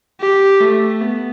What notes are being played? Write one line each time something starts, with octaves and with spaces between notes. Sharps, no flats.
G4
A3
B3